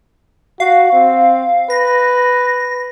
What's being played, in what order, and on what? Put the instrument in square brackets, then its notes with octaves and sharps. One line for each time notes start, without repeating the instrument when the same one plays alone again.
[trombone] F#4 [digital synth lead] F5
[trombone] C4
[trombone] B4 [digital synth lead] A#6